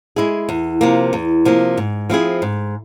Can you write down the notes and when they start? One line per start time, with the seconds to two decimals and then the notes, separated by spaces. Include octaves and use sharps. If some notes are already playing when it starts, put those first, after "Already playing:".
0.16 G#3 E4 G#4
0.49 E2
0.81 C3 F3 A#3
1.13 E2
1.45 C3 F3 A#3
1.77 G#2
2.10 F3 C4 E4 G#4
2.42 G#2